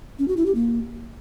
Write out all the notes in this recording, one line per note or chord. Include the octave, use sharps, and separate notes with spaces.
C#4
F#4
E4
G4
A#3